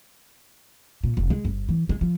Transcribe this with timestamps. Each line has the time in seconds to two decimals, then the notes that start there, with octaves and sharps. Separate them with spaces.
1.04 A#2
1.17 F1
1.30 G#3
1.45 G1
1.69 E3
1.89 G#3
2.01 F3